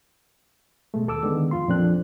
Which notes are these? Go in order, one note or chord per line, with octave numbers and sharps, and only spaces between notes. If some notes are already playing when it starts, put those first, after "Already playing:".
B2 G#3 A3
D#2 A4 D6 E6
D3 D#3 G#3 B3
F2 F4 C6
F2 A#2 F3 C4 D4 F#6